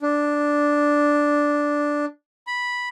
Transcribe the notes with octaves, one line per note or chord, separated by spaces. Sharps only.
D4
B5